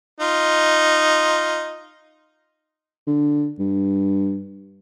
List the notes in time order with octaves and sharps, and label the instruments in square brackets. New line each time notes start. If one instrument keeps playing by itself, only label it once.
[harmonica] D#4 F4
[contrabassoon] D3
G2